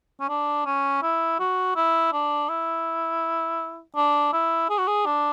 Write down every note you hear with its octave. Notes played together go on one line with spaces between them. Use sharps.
C#4
D4
C#4
E4
F#4
E4
D4
E4
D4
E4
G#4
F#4
G#4
D4